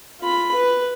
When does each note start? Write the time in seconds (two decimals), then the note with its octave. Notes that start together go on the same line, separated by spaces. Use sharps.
0.21 F4 B5
0.54 B4